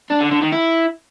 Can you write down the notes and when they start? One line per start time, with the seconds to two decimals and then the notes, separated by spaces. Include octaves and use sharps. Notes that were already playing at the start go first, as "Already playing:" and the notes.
0.10 D4
0.21 D3
0.31 D3
0.42 D#3
0.53 E4